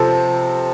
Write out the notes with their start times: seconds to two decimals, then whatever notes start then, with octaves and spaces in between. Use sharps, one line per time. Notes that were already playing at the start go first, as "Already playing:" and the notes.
Already playing: C3 F3 C4 A4